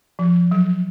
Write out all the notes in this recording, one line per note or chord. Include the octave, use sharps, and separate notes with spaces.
F3
F#3